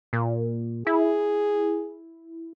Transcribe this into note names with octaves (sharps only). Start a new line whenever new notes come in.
A#2
E4 G#4